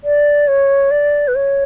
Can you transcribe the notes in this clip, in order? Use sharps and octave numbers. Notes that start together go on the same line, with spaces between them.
D5
C#5
D5
B4
C#5